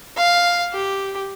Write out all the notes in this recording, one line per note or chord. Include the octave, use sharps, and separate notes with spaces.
F5
G4